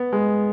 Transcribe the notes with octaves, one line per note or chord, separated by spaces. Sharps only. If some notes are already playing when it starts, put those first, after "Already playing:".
Already playing: B3
G#3